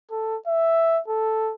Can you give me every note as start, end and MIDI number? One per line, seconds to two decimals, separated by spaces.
0.11 0.37 69
0.47 1.00 76
1.08 1.53 69